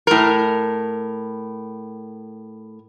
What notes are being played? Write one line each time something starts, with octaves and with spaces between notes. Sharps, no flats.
A2 A#4